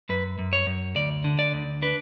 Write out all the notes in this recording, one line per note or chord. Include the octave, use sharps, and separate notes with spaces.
F#2 B4
F#2
C#5
F#2
D2 D5
D3
D5
D2
D4 B4